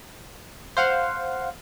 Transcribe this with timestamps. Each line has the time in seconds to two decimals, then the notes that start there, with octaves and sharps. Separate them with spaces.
0.77 C5 F5 F#5